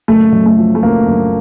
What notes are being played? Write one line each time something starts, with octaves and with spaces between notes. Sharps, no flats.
F#1 A3
F#2
A3
F3
A3
F#1 A#3
F#1